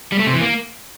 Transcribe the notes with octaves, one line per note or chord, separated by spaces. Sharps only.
G3
A3
C3
E3
A#3